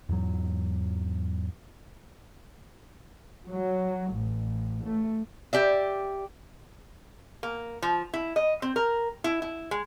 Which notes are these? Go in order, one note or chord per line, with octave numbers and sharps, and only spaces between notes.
E2 G#2 F#3
F#3
A1
A3
G4 D5 E5
A#3
F3
E4
D#5
C4
A#4
E4
E4
G#3